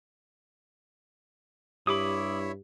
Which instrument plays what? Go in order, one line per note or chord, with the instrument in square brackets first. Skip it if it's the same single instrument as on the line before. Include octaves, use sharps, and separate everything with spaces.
[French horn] G2 [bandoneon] E4 C#5 E5 [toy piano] G4 [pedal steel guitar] B5 D6 D#6